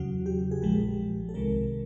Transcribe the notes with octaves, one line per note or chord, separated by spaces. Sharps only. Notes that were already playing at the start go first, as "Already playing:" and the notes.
Already playing: E2 C#3 F#3 F#4
G4
G#4
A#1 A#2 F3 G#3 G4
A4
C2 C3 D#3 G#3 A#4